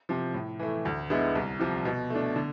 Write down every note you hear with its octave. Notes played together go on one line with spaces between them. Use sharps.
C3 F3
A2
E3 A3
D2
D3 G#3 B3 E4
C2
C3 F3
B2
A3 D4
D3